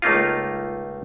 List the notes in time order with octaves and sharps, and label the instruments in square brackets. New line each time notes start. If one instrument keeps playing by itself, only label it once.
[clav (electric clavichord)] C#2 A3 A#3 D#4 F4